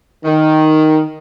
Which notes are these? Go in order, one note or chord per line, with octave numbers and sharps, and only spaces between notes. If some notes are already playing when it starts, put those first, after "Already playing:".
D#3